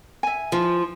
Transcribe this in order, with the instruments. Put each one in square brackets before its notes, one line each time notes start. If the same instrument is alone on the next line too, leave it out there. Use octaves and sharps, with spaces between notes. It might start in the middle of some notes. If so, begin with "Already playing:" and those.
[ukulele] E5 G#5
[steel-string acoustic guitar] F3